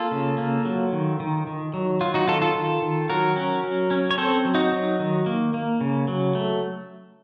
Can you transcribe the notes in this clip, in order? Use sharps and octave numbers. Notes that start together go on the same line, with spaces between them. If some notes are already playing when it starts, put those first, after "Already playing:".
Already playing: A#3 F4 A4
C#3
A#3
F#3
D#3
D#3
D#3
F#3
F#3 F4
D#4 F#4
D#3 F4 A4
F4 A4
D#3
D#3
F#3 F#4 A#4
C#4
F#3
C#4
C#5
C4 A4 C5
F#3
D#4 F#4
F#3
D#3
A#3
A#3
C#3
F#3
A3